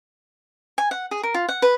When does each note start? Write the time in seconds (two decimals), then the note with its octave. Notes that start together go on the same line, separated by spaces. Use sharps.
0.78 G#5
0.91 F#5
1.11 G#4
1.23 A#4
1.34 F4
1.49 F#5
1.62 B4